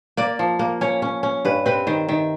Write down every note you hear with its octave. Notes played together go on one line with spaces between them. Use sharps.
A#3 D5
F3
A#3
C#4 C#5
C#4
C#4
G2 B4
C4 B4
D#3 C5
D#3 E5